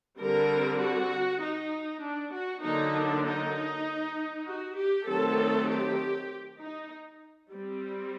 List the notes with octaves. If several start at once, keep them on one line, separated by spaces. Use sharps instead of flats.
D3 G3 C4 A#4
F#4
D#4
D4
F#4
D3 F#3 A#3 D4 D#4
D4
D#4
F#4
G4
D#3 F#3 A3 C4 A4
G4
D#4
G3 C4